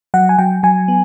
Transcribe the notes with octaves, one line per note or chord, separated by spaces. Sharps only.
F#3 F#5
G#5
F#3 G5
F#3 G#5
B3